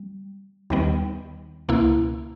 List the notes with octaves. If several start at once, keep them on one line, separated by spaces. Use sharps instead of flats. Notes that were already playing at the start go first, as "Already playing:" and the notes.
Already playing: G3
D#2 D#3 G3 B3
C#2 B2 A#3 E4